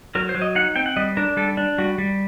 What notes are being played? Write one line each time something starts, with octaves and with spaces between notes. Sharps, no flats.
F#3 A#4
C5
F#3
D#5
D#4 F#5
C4 G5
F#5
G3 D#5
D4 A#4
G3 A4
D4
G3 F#4
G3